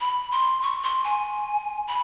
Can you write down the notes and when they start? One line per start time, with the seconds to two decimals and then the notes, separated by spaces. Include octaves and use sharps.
0.01 B5
0.32 C6
0.62 C#6
0.83 C6
1.04 G#5
1.87 B5